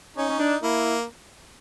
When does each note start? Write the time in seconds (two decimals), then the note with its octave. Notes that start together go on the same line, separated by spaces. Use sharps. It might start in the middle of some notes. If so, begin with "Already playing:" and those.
0.17 C#4 D#4
0.29 C#4
0.39 D4
0.62 A#3 E4